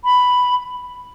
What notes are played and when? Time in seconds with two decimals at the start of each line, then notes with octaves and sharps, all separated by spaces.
0.04 B5